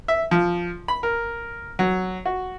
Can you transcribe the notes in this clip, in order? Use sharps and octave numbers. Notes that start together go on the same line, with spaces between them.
E5
F3
B5
A#4
F#3
F#4